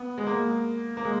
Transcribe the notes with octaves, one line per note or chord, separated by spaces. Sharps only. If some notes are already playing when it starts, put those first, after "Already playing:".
Already playing: B3
G#3
A#3
A#3
G#3